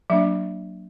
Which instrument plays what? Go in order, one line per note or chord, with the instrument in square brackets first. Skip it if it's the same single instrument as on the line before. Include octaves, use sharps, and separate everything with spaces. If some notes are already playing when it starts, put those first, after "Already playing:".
[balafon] F#3 A#3 D4 E5